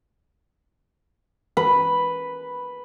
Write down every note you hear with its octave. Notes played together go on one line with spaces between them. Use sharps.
B4